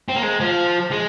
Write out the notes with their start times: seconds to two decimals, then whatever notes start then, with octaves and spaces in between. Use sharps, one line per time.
0.09 C4
0.16 A#3
0.23 G#3
0.40 F3
0.91 G#3